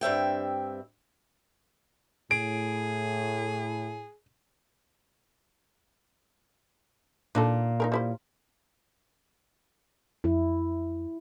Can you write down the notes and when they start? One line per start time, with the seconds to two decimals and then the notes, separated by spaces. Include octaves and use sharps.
0.01 G2 C4 E5 G5
2.31 A2 G#4 D7
7.35 A#2 D4 D#4 A4
7.80 D#4 G#4 A#4
7.92 G3 E4 C5
10.24 F2 E4